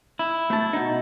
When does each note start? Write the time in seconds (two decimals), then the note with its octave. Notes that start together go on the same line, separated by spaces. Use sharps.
0.19 E4
0.50 A3 A5
0.73 B2 D#4